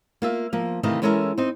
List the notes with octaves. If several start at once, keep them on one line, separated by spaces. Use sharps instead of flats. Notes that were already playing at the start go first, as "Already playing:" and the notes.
A#3 F4 E5
F3 A#3
C3 D#3 E3 A3 D#5 F5
E3 G#3 C#4 A4 A#4 E5
C4 D#4